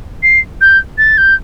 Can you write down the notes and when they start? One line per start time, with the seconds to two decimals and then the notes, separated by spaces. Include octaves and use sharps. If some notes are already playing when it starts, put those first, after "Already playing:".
0.23 C7
0.61 G6
0.98 A6
1.18 G6